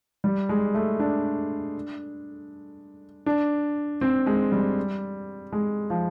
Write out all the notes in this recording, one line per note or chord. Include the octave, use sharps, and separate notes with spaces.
G3
G#3
A3
D4
D4
C4
G#3
G3
G#3
F3